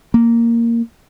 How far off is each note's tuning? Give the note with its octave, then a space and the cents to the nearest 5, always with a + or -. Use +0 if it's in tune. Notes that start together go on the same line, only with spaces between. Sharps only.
A#3 -5